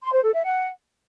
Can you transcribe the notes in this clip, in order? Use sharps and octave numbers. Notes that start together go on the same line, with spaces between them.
C6
C5
A4
E5
F#5